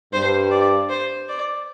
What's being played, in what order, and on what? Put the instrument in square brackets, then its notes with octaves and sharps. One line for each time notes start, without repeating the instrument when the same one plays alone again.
[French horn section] G2 [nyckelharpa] C5
[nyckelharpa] D5
C5
D5